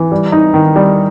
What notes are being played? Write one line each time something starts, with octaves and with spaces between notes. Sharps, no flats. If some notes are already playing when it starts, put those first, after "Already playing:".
Already playing: E3
G3
D#4
D#3
G3